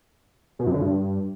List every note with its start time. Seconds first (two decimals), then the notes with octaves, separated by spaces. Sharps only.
0.59 B2
0.67 F#2
0.74 D3
0.81 G2